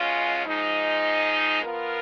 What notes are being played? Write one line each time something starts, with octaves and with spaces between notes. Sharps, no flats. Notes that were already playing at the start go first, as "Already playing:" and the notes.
Already playing: B2 G#3 C#4 F4
G#2 F3 G#3 D#4
F3 B3 F4 A#4